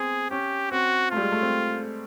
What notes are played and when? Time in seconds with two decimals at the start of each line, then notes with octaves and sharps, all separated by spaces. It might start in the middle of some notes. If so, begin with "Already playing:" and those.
Already playing: B3 C4 G#4
0.30 C#4 G4
0.71 C4 F#4
1.11 A3 F4
1.17 G3
1.21 G#3
1.32 A3
1.42 C4